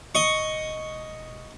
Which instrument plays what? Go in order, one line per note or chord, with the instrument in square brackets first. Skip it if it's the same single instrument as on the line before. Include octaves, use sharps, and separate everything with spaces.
[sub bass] E1 [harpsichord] D#5 C#6